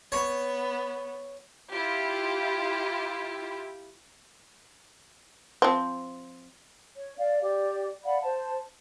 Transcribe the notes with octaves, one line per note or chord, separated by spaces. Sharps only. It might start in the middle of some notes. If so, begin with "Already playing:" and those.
B3 C#5
E4 F4 G4
F3 C4
C#5
D5 F5
G4 D5
D5 F5 F#5 B5
C5 A5